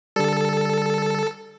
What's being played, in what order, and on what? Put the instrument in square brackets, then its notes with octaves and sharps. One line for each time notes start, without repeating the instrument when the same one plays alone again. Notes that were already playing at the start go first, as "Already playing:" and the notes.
[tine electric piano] D3 G3 [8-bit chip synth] A4